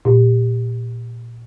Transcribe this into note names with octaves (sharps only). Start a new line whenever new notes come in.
A#2